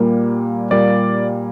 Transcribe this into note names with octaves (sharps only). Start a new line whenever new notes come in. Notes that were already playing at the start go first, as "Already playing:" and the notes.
Already playing: A#2 G3 A#3
A#2 G3 A#3 D5